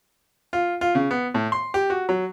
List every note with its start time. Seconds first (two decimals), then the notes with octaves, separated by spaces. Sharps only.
0.53 F4
0.81 F4
0.95 C#3
1.11 B3
1.34 A2
1.52 C6
1.74 G4
1.90 F#4
2.09 F#3